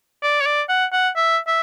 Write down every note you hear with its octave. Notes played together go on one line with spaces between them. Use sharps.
D5
C#5
D5
F#5
F#5
E5
E5